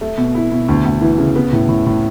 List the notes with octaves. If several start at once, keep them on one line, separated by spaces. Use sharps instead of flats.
A3
B2
E4
B2
D2
D2
E3
C#3
B3
A2
A2
A2